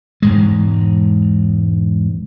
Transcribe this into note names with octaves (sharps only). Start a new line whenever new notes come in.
E1 G#2 G#3